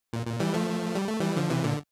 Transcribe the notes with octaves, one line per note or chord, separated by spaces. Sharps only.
A#2
A#2
E3 G3
F3 A3
G3
A3
E3 G3
D3 F3
C3 E3
A#2 D3